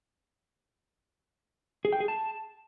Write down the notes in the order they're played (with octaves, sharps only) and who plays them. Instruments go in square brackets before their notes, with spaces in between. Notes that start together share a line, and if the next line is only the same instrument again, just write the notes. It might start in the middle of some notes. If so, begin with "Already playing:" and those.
[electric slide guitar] G#4
G5
G#4
A5